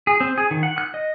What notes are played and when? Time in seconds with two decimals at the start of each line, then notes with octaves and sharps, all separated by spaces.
0.07 G#4
0.20 C4
0.38 G#4
0.51 D#3
0.63 F#5
0.78 F#6
0.94 D#5